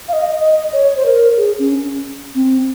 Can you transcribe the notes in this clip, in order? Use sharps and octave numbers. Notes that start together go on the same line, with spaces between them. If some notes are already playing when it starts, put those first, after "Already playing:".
F5
D#5
D#5
C#5
C5
A#4
G#4
C#4
C4